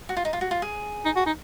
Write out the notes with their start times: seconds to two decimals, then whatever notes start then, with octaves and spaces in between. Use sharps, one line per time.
0.09 F#4
0.17 F4
0.25 D#4
0.33 F4
0.41 F#4
0.51 F4
0.62 G#4
1.05 D#4
1.16 F#4
1.26 D#4